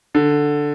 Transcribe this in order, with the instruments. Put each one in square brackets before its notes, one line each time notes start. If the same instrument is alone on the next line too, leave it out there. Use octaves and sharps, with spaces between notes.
[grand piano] D3